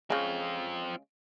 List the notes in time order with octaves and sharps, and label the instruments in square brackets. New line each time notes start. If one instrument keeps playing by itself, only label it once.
[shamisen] C#3 G#3 [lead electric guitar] C4 F4